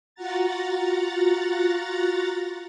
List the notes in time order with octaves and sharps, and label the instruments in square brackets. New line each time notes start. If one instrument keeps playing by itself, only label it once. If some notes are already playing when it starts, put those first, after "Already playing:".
[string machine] F4 F#4 F#5 A#5 A6